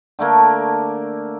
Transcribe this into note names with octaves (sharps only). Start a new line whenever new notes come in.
D3 A3 A#3